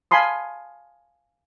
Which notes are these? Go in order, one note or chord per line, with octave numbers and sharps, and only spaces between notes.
F5 G#5 A5 B5 C6 D#6